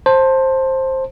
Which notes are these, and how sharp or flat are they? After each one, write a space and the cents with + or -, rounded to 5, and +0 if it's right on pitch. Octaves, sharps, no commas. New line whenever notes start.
C5 +15 A5 +15